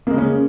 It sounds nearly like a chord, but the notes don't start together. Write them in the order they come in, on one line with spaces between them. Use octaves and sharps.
A#3 G#3 C#3 C#4